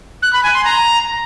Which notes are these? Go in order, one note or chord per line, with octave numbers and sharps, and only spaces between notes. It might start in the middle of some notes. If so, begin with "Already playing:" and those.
F#6
B5
G#5
C6
A#5